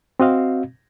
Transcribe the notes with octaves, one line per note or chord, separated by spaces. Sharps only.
C4 F#4 D#5 F5